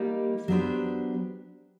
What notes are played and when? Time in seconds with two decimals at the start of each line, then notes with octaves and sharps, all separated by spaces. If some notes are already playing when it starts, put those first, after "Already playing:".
Already playing: G3 A#3 D#4 G4
0.48 F#3 B3 D4 G4 C5